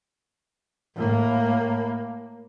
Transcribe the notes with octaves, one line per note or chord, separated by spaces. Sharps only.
A2 A#3